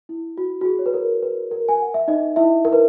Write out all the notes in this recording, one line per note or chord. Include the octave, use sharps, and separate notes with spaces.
E4
F#4
F#4
G#4
C#5
B4
A#4
B4
A#4
G#5
F#5
E5
D#4 D#5
E4 E5
A#4
B4